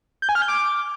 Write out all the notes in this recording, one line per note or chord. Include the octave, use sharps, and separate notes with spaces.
G6
G#5
F6
G6
D6